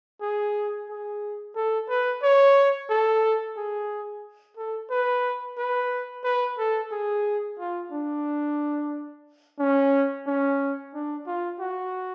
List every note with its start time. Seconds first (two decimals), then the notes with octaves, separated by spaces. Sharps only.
0.21 G#4
0.90 G#4
1.56 A4
1.89 B4
2.23 C#5
2.90 A4
3.57 G#4
4.57 A4
4.90 B4
5.58 B4
6.24 B4
6.58 A4
6.91 G#4
7.59 F4
7.92 D4
9.59 C#4
10.26 C#4
10.94 D4
11.27 F4
11.60 F#4